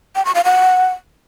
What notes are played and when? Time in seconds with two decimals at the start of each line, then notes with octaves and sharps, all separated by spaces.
0.16 G5
0.25 C#6
0.35 F5
0.45 F#5